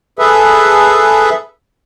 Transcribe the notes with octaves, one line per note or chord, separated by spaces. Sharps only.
G#4 A4 B4 E5